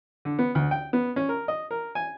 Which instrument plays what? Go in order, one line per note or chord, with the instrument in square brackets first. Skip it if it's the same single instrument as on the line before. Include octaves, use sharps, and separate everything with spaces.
[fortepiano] D3
B3
D2
G5
B3
C#4
A#4
D#5
A#4
G#5